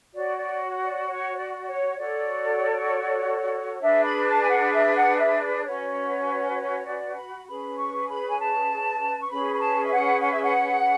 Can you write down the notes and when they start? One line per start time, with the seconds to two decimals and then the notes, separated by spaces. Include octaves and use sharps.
0.14 F#4 C#5 D5
0.37 D5
0.83 D5
1.06 C#5
1.37 D5
1.60 D5
1.67 C#5
1.97 F#4 A4 C#5 D5
3.81 D4 G#4 B4 E5
4.03 B5
4.26 A5
4.44 G#5
4.49 F#5
4.72 E5
4.95 F#5
5.18 E5
5.40 D5
5.64 C#4 F#4 B4 C#5
6.55 C#5
6.86 D5
7.16 B5
7.47 C#4 G#4 B4 B5
7.77 C#6
8.08 B5
8.27 G#5
8.39 A5
9.22 C#6
9.30 C#4 G#4 B4 B5
9.53 B5
9.61 A5
9.85 E5
9.91 F#5
10.22 F#5
10.32 E5
10.42 F#5